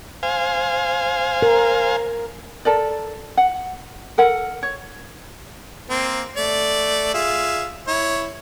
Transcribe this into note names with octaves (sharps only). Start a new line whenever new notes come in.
C5 F5 G#5
A#4
A4 A#4 D5
F#5
A4 A#4 F#5
C#5
A#3 C4
A3 D5
F4 G#4 E5
E4 C#5